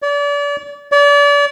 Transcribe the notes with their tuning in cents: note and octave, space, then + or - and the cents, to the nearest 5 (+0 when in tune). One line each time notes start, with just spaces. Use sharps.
D5 -35
D5 -35